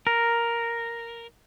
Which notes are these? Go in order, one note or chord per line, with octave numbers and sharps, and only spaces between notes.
A#4